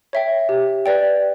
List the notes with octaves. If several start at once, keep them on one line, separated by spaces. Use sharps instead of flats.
C#5 E5 G5
G4
B4 D5 G5